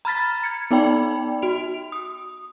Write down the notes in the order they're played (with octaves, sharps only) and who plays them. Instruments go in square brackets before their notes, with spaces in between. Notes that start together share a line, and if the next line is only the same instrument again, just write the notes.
[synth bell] A#5 B5 F6 A6 B6
G#6 C#7
B3 D#4 D5 G5 B5
F#4 D7 F7
D#6